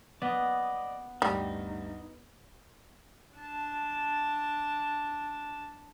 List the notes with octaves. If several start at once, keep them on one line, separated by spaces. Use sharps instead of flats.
B3 D5 D#5
D2 G2 G3 D#4
D4 A5